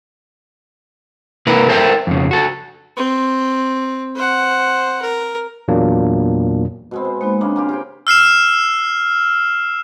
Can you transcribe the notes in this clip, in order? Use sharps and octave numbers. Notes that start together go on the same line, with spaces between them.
C3 A#3 E4 A#4 B4
A4 A#4 C5 E5 G5
F2 C#3
F#4 A4
C4
C5 F#5
A#4
E2 A#2 F#3 A#3 D4
B2 G#3 C4
C5
G#3 A#3 B3 D#4
C#3 G#3 A#3 C4 D4 F#5
A#3 F4 G4
F4 G4 C5 F5 G5
E6 F6 C7 E7